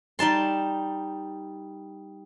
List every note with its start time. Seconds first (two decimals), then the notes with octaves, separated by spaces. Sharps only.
0.19 G3 D#4 A5 C6